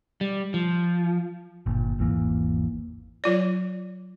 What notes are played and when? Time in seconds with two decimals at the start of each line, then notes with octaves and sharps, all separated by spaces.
0.21 G3
0.54 F3
1.66 G1 A#2
1.99 G#1 E2 E3 A#3
3.24 F#3 F4 D5